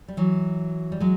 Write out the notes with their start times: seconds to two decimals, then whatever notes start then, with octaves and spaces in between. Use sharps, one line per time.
0.08 G3
0.17 E3 F#3
0.92 G3
1.00 F#3 G#3